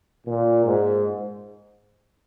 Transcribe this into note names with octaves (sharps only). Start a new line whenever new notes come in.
A#2
G#2